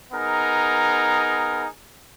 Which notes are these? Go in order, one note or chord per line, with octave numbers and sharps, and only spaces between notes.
B3 D#4 G#4 A#4